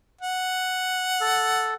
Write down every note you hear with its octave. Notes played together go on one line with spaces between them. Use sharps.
F#5
A4